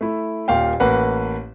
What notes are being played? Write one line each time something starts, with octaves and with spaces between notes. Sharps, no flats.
A3 E4
D#1 A#2 F5 G5
A1 A#3 B4 F#5